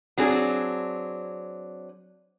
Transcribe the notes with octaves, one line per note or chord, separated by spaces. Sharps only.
F#3 C4 D4 G#4